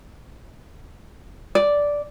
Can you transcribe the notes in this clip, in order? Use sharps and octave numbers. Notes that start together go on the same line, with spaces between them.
D5